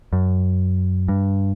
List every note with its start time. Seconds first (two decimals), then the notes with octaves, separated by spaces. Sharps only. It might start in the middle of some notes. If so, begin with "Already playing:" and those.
0.13 F#2
1.08 G2